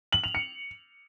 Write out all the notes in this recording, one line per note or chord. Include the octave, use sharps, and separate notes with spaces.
F#7
F7
C#7